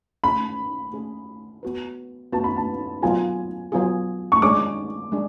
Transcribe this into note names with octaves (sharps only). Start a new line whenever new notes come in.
A3 C#4 G#4 B5
A3 C#4 G#4
B3 F#4 B4
B3 F#4 B4 A5
B5
A5
F#3 B3 F4 G#4 G#5
F#3 B3 F4 G#4
C#6
G#3 D4 G#4 C#5 D6
G#3 D4 G#4